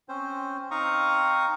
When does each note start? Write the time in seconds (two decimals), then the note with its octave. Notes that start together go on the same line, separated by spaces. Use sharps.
0.09 C4 C#4 C5
0.71 C4 D#4 F5 A#5 C#6 D#6